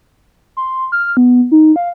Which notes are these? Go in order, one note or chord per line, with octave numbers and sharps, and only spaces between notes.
C6
F6
B3
D#4
F5